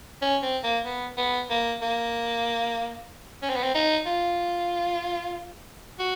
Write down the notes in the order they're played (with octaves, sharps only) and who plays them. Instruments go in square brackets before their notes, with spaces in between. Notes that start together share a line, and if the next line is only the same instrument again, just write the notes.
[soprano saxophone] C#4
C4
A#3
B3
B3
A#3
A#3
C#4
C4
B3
C4
D#4
F4
F#4